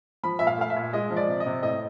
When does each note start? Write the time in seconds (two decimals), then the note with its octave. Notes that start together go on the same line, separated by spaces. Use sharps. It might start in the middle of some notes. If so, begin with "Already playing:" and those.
0.23 F3 B5
0.39 A#2 E5
0.47 F5
0.58 A3 F5
0.70 E5
0.76 A#2
0.93 G#3 D#5
1.10 F3
1.17 D5
1.28 C3
1.40 D#5
1.46 C3
1.63 A2 D#5